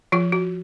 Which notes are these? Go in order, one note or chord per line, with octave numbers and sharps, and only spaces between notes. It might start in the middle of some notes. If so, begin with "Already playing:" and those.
F3 F4
F#4